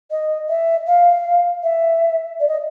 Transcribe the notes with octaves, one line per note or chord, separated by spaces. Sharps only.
D#5
E5
F5
E5
D5
D#5